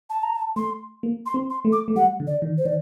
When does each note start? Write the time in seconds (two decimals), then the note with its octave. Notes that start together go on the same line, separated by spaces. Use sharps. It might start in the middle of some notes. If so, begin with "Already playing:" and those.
0.10 A5
0.23 A#5
0.36 A5
0.56 A3 C6
1.03 A#3
1.26 C6
1.34 C4
1.50 C6
1.65 A3
1.72 D6
1.88 A3
1.96 G3 F#5
2.20 D3
2.27 D5
2.42 D#3
2.58 C5
2.65 D#3 D5